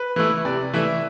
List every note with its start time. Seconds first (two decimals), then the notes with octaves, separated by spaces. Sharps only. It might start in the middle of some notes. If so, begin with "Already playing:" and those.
Already playing: B4
0.16 E3 A3 E4
0.45 C3 D5
0.73 E3 A3 E4 E5